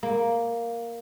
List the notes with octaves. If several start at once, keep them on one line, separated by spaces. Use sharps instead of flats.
A#3